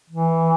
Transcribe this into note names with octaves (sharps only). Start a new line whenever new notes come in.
E3